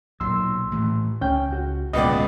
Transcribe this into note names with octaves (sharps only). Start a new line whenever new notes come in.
B1 A#2 F#3 C6 E6
A2 E3
C#2 C#4 G5 G6
F#4
D1 C#2 B2 G#3 B3 D5 D#5 G5